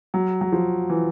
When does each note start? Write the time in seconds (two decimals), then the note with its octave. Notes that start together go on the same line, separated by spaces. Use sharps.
0.14 F#3
0.41 F#3
0.52 F3
0.90 E3